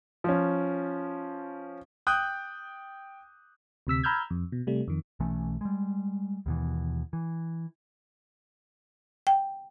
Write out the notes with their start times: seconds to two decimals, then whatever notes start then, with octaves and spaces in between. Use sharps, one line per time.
0.24 F3 C#4
2.07 G5 D#6 F#6 G6
3.87 D2 C3 E6 B6
4.03 A#5 B5 E6 F6 G6 G#6
4.30 F2
4.52 B2
4.67 C3 G3 A3
4.88 F2 D#3
5.20 B1 E3 A3 C#4
5.61 G3 G#3
6.46 D#2 B2 E3
7.13 E3
9.27 G5